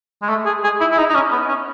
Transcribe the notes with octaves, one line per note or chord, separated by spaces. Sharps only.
G#3
A3
G#4
G#4
E4
E4
D#4
D#4
C#4
B3
C#4